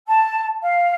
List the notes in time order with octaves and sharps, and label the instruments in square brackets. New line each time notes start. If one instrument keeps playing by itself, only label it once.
[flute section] A5
F5